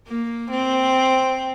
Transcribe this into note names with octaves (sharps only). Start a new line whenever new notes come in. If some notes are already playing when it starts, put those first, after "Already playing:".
A#3
C4